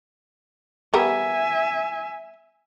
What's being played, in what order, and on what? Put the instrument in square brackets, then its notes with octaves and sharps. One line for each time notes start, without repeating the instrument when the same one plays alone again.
[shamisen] G3 B3 A#4 [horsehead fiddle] E5 G#5